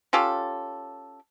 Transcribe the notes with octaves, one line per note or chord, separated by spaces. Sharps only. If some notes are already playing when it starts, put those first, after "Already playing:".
C#4 F4 G4 A4